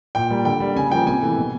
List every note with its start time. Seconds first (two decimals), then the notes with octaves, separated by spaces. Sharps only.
0.15 A#2 G5
0.31 G3 A#3
0.45 D3 G5
0.60 G3 A#3
0.76 C#3 G#5
0.91 F3 A#3 G5
1.06 C3 G#5
1.22 E3 A3
1.37 B2